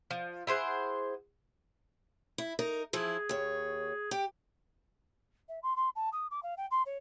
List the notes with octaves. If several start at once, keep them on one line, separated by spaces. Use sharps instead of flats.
F3
E4 G#4 C5 F#5
E4
D#4 A#4
E3 F3 E4 G#4
D#2 C#5
G4 G5
E5
C6
C6
A5
D#6
D6
F5
G5
C6
C#5